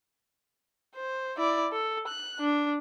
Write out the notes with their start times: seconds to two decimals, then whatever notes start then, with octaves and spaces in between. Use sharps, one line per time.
0.95 C5
1.37 E4 D5
1.72 A4
2.07 F#6
2.40 D4